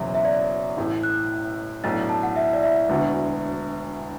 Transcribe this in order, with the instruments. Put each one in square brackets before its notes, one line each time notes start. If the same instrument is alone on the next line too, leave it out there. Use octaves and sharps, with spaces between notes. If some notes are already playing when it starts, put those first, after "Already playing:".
Already playing: [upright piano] F#1 E2 B2 F#3 [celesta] E5
[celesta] E5
D5
[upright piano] A1 A2 E3 A3
[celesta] F#6
[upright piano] B1 A2 A3 D4 F#4 [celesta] A6
[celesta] A5
F#5
E5
D5
E5
[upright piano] E1 D2 D3 B3 F#4